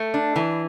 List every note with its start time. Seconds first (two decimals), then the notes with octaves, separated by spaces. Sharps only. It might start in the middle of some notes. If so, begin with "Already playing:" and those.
Already playing: A3
0.14 D4
0.36 E3